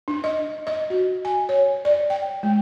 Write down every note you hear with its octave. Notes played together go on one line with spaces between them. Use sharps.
D4
D#5
D#5
F#4
G#5
C#5
D5
G5
G#3